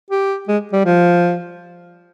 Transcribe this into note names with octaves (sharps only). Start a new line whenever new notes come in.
G4
G#3
G3
F3